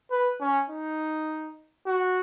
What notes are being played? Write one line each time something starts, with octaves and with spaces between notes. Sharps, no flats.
B4
C#4
D#4
F#4